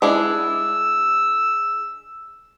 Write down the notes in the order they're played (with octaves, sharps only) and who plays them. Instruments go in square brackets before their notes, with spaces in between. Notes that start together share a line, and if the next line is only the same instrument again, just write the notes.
[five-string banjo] G#3 D4 E4 [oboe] E6